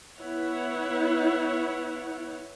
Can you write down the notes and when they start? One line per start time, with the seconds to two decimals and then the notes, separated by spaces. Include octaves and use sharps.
0.19 B3 E4 C#5 F#5